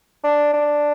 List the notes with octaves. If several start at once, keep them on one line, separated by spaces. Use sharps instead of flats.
D4
D4